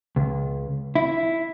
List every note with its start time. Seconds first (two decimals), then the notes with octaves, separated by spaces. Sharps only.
0.16 C#2
0.96 E4